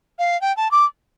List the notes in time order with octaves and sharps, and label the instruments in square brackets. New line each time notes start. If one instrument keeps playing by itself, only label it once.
[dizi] F5
G5
A5
D6